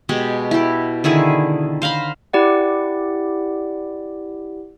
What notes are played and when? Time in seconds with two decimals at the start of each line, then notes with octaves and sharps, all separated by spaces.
0.09 B2 G#3 G4
0.51 E4 G4
1.04 D3 D#3 E4 G#4
1.82 C5 F5 A#5 B5
2.33 E4 G4 D5 F#5